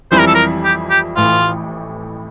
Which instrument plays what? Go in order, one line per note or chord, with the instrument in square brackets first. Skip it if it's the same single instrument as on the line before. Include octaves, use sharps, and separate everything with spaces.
[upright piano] F2 E3 G3 C4 E4 [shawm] C5
[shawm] A#4
A4
A#4
G4
G4
[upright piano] A1 A2 E3 [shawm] F4